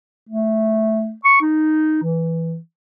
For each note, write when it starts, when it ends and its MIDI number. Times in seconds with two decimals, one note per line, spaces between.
0.29 1.13 57
1.24 1.40 85
1.41 2.02 63
2.02 2.57 52